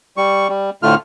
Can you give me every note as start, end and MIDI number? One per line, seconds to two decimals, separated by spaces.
0.17 0.48 55
0.17 0.48 85
0.49 0.70 55
0.83 0.95 38
0.83 0.95 45
0.83 0.95 50
0.83 0.95 57
0.83 0.95 65
0.83 0.95 89